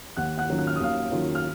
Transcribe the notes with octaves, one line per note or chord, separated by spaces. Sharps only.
D#2 F#5 F#6
F#5 F#6
D#3 F#3 C#4 F4
F#6
F6
D#6
D#2 F5 F6
D#3 F#3 C#4 F4
F6